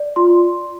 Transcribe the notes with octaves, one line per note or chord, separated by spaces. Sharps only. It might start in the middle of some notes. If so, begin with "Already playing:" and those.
Already playing: D5
F4 C6